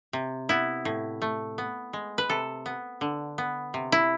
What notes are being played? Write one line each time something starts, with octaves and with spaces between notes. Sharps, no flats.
C3
B3 E4
A2
A3
B3
G#3
B4
C3 A4
B3
D3
B3
C3
E4